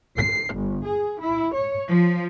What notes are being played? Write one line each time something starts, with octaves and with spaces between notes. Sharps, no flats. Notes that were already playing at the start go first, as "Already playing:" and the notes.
C7
G1
G#4
E4
C#5
F3